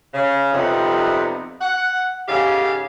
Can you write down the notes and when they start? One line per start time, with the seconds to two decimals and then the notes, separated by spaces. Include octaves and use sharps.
0.13 C#3
0.53 F2 C3 G3 B3 D#4
1.60 F#5
2.28 G#2 C#3 G4 A4 F5